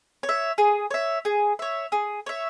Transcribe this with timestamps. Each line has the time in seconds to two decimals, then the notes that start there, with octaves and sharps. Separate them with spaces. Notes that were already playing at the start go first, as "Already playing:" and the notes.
0.23 C#5
0.29 E5
0.58 G#4
0.91 C#5 E5
1.25 G#4
1.59 C#5 E5
1.92 G#4
2.26 C#5 E5